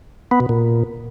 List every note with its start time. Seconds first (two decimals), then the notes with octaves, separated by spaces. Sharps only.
0.31 B3
0.40 B2
0.49 A#2